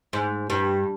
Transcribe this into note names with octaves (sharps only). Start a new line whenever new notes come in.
G#2
G2